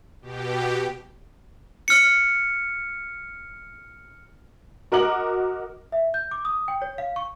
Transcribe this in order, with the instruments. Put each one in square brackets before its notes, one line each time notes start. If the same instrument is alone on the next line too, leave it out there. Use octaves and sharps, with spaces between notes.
[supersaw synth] B2 G4
[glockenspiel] F6 C#7
[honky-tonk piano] F#4 A#4 D#5 D6 F#7
[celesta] E5
G6
D6
D#6
G5
C#5
F5
C#6